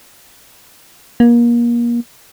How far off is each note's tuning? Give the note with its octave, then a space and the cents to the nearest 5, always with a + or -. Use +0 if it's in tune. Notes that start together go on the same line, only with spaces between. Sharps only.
A#3 +30